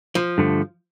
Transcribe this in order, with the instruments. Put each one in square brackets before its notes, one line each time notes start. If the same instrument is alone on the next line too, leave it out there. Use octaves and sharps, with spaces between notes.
[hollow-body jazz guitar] F3
[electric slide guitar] G2 D3 A3